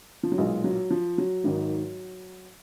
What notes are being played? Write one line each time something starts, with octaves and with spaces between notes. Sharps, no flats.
F3
F#3
B1 A#2 G#3
F#3
F3
F#3
G#1 G#2 D#3